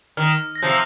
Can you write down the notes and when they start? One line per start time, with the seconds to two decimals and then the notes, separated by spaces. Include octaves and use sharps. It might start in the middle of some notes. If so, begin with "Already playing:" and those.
0.17 D#3 F6
0.56 A#6
0.63 C3 F3 G6